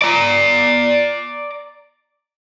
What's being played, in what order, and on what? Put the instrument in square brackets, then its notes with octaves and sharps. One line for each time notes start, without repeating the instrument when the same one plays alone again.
[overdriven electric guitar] D5 A#5